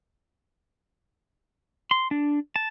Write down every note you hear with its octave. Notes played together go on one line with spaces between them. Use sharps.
C6
D4
A5